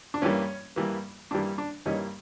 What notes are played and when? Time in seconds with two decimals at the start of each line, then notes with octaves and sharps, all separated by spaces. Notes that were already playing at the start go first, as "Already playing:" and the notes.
0.14 D4
0.22 G2 E3 G3 A#3 C#4
0.76 G2 E3 G3 A#3
1.31 G2 E3 G3 A#3 D4
1.58 D4
1.86 G2 E3 G3 A#3 C#4 D#4